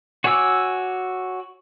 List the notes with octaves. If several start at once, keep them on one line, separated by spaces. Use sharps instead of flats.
F#4 C#5 G#5 D6 E6